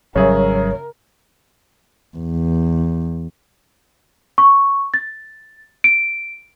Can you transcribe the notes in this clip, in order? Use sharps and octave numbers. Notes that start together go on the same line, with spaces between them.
G#1 C#3 F#3 G3 G#4 A#4 C#5 E5
E2
C#6
A6
D7